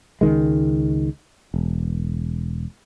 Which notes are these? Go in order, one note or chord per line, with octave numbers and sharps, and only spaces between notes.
C#2 D#3 G#3
E1